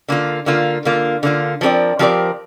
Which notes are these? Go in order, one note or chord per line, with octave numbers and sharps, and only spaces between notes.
D3 A#3 F4
D3 A#3 F4
D3 A#3 F4
D3 A#3 F4
F3 C4 G4 A#4 D5
F3 C4 G4 A#4 D5